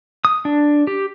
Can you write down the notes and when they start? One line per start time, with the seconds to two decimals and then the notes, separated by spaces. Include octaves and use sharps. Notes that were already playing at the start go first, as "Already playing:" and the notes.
0.25 D#6
0.45 D4
0.87 G4